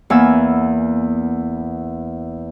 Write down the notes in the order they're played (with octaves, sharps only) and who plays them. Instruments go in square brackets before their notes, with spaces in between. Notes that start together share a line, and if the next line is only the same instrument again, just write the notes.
[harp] E2 A#3 B3 G#5 E6